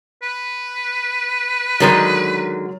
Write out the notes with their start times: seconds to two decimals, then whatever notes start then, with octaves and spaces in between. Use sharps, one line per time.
0.22 B4
1.80 D3 D#3 F#3 G#3 A#4 A6